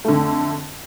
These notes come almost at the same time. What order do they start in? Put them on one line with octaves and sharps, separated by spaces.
A3 D3 F2